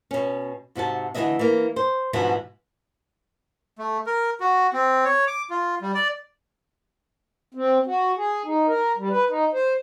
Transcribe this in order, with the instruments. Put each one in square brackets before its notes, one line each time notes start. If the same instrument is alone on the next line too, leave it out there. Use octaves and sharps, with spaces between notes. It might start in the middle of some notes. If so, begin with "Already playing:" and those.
[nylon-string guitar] B2 C#4
G#2 C3 F#4 A5
D2 E3 F#3 A3 D#5 E5
E3 A#3
C5
G#2 B2 E3 F3 D4 F#4
[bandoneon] A3
A#4
F#4
C4
C#5
D6
F4
G3
D5
[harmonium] C4
F#4
G#4
D#4
A#4
G3
B4
D#4
C5